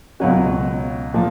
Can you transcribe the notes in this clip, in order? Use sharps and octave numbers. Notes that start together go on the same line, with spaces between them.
C#2 B2 F#3 C#4 F#4
A#2 F3 A#3